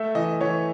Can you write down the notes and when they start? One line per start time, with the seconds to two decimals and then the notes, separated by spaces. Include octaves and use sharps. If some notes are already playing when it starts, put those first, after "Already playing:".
Already playing: A3 E5
0.15 E3 D#5
0.41 E3 C#5